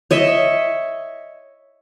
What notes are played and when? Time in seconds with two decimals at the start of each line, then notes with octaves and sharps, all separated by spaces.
0.11 C#5 D#5 E5